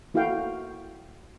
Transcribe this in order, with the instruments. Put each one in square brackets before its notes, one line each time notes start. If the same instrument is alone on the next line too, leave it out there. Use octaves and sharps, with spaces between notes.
[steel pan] A#3 E4 F#4 A4 F5 G5